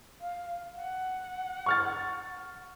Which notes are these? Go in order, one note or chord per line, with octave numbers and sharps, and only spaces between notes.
F5
F#5
C#6 F6 A6